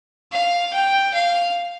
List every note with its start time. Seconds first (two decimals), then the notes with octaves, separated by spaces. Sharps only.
0.32 F5
0.73 G5
1.14 F5